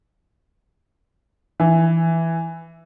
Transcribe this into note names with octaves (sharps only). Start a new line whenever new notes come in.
E3